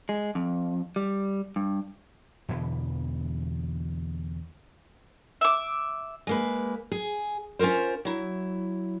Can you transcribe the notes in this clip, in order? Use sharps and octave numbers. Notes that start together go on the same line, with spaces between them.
G#3
F2
G3
G2
E2 B2 D3 E3
E5 D6
G#3 A#3 B4
G#4
C#4 F4 A4 A#4 C5
F#3 E4